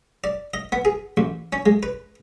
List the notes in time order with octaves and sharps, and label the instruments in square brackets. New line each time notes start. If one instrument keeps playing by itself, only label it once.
[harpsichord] D5
D#5
B3
G#4
A1
C#4
G#3
B4